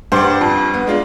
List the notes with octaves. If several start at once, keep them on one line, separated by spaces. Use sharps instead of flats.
G2 C5 D5 F#5
F2
B3
G#3 D4 F4